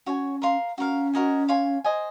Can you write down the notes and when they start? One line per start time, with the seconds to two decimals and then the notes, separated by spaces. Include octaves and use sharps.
0.06 C#4 F#4 C#5 G#5
0.42 A#4 F5 C6
0.78 C#4 F#4 A#4 F5
1.13 F#4 A#4 D#5 G#5
1.49 C#5 F5 G#5 C6
1.84 C5 D#5 G#5